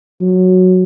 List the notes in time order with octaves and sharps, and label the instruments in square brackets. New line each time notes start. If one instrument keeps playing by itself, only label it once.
[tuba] F#3